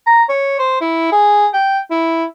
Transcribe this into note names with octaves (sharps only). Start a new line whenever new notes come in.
A#5
C#5
C5
E4
G#4
G5
E4